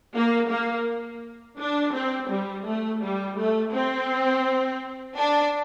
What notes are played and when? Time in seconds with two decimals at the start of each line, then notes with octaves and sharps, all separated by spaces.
0.15 A#3
0.51 A#3
1.59 D4
1.94 C4
2.31 G3
2.66 A3
3.02 G3
3.37 A3
3.73 C4
5.17 D4